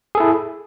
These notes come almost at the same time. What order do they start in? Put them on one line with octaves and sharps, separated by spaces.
G#4 A4 E4